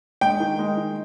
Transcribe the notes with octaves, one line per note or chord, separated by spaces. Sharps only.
G#3 G5
D#3
G#3
D#3